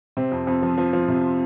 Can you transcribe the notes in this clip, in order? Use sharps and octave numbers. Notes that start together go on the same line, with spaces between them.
C3 C4
F2
F2
F3
F3
F3
C3